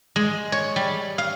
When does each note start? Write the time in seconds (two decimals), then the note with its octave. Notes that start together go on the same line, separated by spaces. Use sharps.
0.16 G#3
0.52 C#5
0.76 G3
1.18 F5